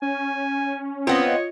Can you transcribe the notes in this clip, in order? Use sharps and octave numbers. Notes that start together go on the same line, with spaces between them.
C#4 G#5
B3 C4 F4 C#5 D#5